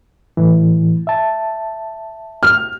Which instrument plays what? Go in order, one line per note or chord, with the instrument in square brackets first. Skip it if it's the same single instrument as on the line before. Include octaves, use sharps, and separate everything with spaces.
[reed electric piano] A2 E3
E5 A5
[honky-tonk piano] F6